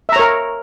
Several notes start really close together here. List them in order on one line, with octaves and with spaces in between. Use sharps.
E5 A#5 C#5 A#4